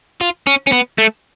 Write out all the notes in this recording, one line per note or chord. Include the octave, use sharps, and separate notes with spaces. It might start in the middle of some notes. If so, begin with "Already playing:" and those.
F4
C#4
C#4
B3
A3